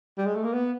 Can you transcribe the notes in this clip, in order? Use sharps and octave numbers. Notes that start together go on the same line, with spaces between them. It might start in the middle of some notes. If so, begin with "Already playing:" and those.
G3
G#3
A3
A#3
B3